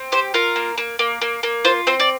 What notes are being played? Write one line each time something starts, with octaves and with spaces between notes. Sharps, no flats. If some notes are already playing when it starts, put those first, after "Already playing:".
Already playing: C4
G4 C5
F4 A#4
A#3
A#3
A#3
A#3
A#3
F4 C5
C4 C5
D5